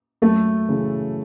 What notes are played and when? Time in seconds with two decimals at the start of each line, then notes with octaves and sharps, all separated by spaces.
0.22 F#2 A3 A4
0.69 C#3 E3